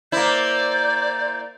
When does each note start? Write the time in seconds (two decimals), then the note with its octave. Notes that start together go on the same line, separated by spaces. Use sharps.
0.12 A#3 E4 C5 D5 G6